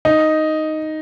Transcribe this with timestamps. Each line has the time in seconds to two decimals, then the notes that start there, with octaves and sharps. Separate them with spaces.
0.05 D#4